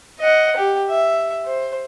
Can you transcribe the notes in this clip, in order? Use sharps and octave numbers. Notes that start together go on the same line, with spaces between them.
D#5 F#5
G4
E5
C5